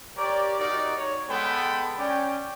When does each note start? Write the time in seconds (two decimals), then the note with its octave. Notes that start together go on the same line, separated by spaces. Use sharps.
0.17 G4 A#4 C#5 D5
0.60 D#4 F#4 G4 A#4 D5 D#5
0.96 C#5
1.29 G#3 B3 A4 G5 A5 B5
1.98 C#4 D5 G5